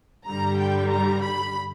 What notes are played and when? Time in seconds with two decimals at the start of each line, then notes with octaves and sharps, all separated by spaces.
0.25 G2 D3 G3 A#5
0.58 G5
0.90 A#5
1.22 B5